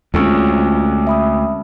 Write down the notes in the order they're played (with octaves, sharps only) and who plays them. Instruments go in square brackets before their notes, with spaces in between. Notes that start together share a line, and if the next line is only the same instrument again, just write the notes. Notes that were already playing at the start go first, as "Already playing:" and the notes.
[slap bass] D2 [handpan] G#3 C4 C#4 [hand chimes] F4 A4 C#6
[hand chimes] E5 B5 D#6